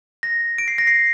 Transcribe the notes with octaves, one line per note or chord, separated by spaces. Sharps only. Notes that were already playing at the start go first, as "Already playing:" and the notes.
A#6
D7
C7
A#6
C7